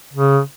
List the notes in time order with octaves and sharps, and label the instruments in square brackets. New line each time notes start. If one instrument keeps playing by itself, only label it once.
[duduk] C#3